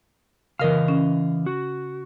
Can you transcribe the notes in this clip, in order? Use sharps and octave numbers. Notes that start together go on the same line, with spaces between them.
C#3 E3 A#4 D#5 F5
C#4
F#4